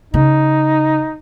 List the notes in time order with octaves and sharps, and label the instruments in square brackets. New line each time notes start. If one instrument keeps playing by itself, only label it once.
[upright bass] C#3 [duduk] D#4